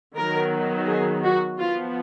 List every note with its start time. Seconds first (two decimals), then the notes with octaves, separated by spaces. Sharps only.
0.17 D#3 F#3 B3 A#4
0.88 G#4
1.24 F#4
1.59 F3 B3 F4